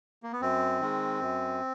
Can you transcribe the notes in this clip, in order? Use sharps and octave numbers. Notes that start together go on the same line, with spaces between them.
A#3
B3
F#2 C4
D#3 G#3
F#2